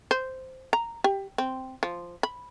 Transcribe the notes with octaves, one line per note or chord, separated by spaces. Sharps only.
C5
A#5
G4
C4
F3
B5